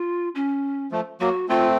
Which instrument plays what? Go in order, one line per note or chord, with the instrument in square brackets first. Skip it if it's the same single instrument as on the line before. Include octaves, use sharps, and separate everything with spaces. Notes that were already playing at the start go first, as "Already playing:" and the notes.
Already playing: [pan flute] F4
C#4
[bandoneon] F3 A3
[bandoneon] F#3 A#3 [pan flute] F#4
[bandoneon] A3 C4 [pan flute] F4